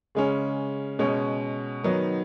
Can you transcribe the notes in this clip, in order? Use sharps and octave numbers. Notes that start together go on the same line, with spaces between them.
C#3 G#3 C#4
B2 G#3 C#4
D#3 F#3 B3 D#4